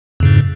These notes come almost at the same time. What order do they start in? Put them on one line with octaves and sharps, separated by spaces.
F2 C#3 G#2